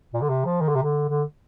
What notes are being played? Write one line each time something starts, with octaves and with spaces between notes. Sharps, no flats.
A#2
D3
C3
F3
D#3
D3
C3
D3
D3